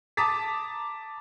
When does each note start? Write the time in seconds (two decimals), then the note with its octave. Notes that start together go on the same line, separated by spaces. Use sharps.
0.17 A5 A#5 D6 D#6 A6 B6